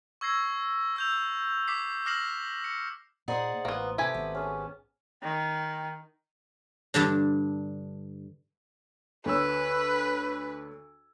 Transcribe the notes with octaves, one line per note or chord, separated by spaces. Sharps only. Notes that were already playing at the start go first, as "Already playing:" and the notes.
C#6 E6 G#6 A#6 C7
E6 G6 F7
G6
D6 B6 C7
D6 F6 A#6 C7 E7 F#7
C#7
A#2 D#4 G#4 C5 D5 D#5 F#5
A1 A#3 B3
C3 A3 G4 B4 G#5
G#1 B3
C#4 G#4 A5
D#3 G5
G2 D3 D4
D2 B4 C#5 E6